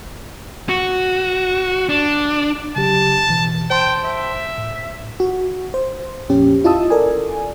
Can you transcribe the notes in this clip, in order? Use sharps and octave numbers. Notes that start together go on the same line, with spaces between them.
F#4
D4
C#3 F#3 G4 A5
B1 B2 E3
C5 G5 A5 C6
E5
G#1 A2
F#4
C5
F2 A#2 C#4 G4
E4 F4 D#5 A5 D#6 E6
A4 A#4 D5 G#5